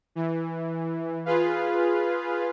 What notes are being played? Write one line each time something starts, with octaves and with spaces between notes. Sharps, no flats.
E3
F4 G#4 B4 F5